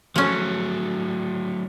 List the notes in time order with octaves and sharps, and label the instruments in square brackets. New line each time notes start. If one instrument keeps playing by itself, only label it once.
[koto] F3 C#4 [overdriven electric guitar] F#3 A3